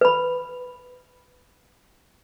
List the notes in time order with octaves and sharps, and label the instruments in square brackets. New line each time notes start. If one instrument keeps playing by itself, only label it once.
[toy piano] B4 B5